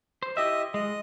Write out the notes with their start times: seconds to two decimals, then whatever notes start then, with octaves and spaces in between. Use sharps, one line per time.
0.23 C5
0.37 E4 G4 D#5 E5
0.74 G#3 D#5